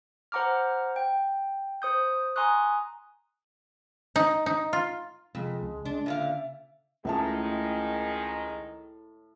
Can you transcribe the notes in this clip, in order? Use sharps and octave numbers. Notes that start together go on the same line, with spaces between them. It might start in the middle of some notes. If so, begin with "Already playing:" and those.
C5 F#5 A#5 D6 F6
G5
C5 D#6 G6
G#5 A#5 C6 C#6 D#6 F#6
D#4
D#4
F4
F2 C3 G#3
C#2
C#3 D4
A#2 D3 E5 F5
C#2 A2 D#3 G#3 E5 A5